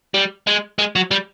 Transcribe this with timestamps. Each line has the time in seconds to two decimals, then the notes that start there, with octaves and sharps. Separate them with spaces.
0.14 G3
0.47 G#3
0.78 G#3
0.96 F#3
1.11 G3